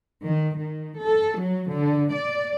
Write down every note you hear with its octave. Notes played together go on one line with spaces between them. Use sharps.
D#3
D#3
A4
F#3
D3
D5